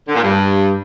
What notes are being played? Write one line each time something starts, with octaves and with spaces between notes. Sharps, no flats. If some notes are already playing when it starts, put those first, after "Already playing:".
D3
A#2
G2